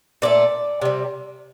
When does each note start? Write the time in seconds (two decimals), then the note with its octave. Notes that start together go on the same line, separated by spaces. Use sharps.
0.22 A#2 A3 D5
0.82 C3 G3